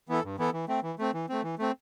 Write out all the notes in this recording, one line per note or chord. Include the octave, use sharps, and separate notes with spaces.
E3 B3 E4 A4
G2
E3 B3 E4 A4
E3
A3 C4
E3
A3 C4
E3
A3 C4
E3
A3 C4